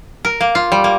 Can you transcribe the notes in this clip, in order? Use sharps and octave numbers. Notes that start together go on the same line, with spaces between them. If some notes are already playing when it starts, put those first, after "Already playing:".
A#4
A#3
F4
G3
A#3